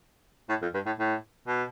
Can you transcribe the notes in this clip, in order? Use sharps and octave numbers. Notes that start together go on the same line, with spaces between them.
A2
F2
G2
A2
A2
B2